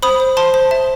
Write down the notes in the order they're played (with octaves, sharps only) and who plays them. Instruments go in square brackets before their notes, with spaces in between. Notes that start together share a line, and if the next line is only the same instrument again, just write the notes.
[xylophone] C5 B5 D#6
C5
C5 A5 C6
C5
E5 A5